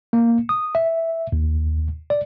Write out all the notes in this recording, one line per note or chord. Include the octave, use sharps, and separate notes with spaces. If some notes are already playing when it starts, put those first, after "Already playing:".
A#3
D#6
E5
D#2
D5